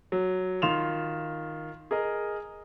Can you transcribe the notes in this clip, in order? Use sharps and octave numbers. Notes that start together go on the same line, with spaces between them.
F#3
D#3 F4 C6 E7 F7
G#4 A#4 D#5